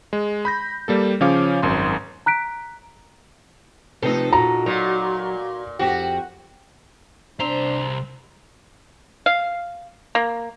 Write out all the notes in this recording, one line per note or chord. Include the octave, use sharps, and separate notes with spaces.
G#3
B5 G6 A#6
G3 A#3 A4
C#3 F3 C#4 C#5 F5 D6
G#1 F#2 C6
A#5 F#6 B6 D7
C3 F3 A3 D#4 A4 B4
A#2 F#4 A#5
A#2 F#3
F2 F#4 G4 G5
C2 C4 D4 C5 A#5
F5
A#3